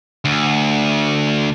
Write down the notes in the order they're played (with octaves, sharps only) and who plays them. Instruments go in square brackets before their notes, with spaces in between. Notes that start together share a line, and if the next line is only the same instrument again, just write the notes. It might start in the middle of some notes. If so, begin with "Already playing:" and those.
[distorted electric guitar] D2